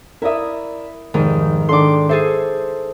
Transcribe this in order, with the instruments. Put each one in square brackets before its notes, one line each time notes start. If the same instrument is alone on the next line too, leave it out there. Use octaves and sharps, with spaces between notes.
[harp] E4 D#6 [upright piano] A#4 D5 E5
[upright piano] F1 [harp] G#2 D#3
[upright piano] D#3 D4 A4 [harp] C6 D6
[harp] G#4 A4 C5 [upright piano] E5